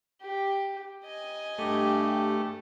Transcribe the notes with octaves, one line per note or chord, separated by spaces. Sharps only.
G4
D#5 G#5
G2 A3 G4